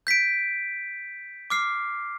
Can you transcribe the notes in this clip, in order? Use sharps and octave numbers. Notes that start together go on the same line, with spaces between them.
G6 B6 D7
D6 F6 C7